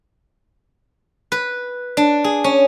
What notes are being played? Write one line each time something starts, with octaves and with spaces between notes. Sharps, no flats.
B4
D4
G#4
C#4